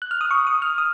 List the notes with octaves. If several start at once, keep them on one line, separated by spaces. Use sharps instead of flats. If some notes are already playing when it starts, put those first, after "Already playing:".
F#6
F6
D#6
C#6
D#6
F6
D#6